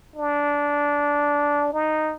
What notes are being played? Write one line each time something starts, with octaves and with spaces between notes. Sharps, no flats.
D4
D#4